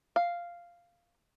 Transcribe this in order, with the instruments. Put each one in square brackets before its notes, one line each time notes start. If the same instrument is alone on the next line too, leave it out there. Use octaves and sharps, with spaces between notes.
[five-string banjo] F5